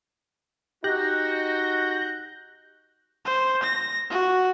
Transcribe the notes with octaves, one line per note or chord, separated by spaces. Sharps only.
D#4 F#4 G4 F#6 G6 A#6
C5
A#6
F#4